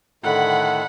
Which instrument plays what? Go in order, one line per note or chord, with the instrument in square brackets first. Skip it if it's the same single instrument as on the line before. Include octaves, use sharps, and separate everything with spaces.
[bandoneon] A2 D3 D#3 [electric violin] F#5 B5